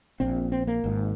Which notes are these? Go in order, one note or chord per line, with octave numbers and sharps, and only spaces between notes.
A#1 A#2 C4
C4
A#3
G#1 G#2